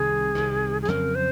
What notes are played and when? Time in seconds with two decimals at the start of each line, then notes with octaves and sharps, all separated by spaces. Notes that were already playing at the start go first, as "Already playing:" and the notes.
Already playing: C2 C3 D#3 G#4
0.35 C2 C3 D#3
0.82 G#4
0.88 F2 C#3 F#3 C4 A#4
1.15 C5